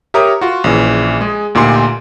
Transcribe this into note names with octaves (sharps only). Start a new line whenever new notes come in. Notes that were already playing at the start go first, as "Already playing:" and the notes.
G4 A#4 C#5 E5 A#5 D#6
F4 F#4
A#1 C#3 E3
G#3 G#4
D2 A#2 D#4 G4 C6